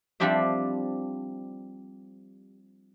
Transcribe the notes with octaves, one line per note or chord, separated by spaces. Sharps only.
F3 G3 C4 D4 G4 E5